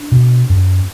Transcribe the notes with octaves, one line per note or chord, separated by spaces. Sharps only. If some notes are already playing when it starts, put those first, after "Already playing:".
Already playing: D4
B2
F#2